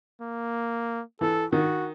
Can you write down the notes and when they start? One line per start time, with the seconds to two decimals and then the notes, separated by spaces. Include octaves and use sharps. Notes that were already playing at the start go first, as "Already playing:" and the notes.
0.21 A#3
1.21 E3 A4
1.52 D#3 F#4